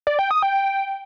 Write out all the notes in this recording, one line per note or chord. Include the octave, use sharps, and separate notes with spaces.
D5
G5
D#6
G5